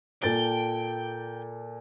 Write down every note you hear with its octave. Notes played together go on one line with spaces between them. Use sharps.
A#2 A4 D5 G5 A6 D7